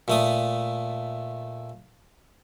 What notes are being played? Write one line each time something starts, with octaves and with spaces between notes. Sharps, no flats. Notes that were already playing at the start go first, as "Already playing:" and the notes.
A#2 A3 D#6